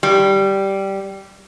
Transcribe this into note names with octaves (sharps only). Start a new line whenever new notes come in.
G3